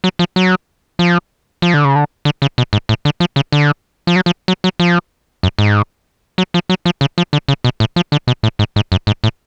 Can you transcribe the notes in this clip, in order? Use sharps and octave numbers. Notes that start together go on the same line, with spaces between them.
F#3
F3
F#3
F3
F3
D3
C#3
D3
D3
C#3
B2
G#2
A2
D3
F3
C#3
D3
F3
F#3
F3
F#3
F#3
F3
F#2
G#2
F#3
F3
F#3
F3
C#3
F3
D3
C#3
B2
A2
F3
D3
B2
A2
G#2
G#2
F#2
G#2
A2